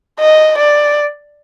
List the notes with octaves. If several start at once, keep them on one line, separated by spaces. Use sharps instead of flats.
D#5
D5